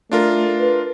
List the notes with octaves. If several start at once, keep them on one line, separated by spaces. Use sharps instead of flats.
A3 D4 F4 A#4
B4